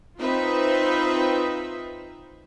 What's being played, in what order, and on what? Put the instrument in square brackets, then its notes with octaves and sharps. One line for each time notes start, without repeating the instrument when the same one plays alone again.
[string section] C4 D#4 F4 B4 C5 E5